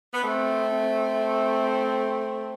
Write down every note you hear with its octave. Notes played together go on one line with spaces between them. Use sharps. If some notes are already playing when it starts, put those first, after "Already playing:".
B3
A3 C4
C4